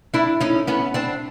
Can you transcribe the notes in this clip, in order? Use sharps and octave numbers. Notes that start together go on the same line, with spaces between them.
D4 E4
C#4 D#4
B3 C#4
C4 D4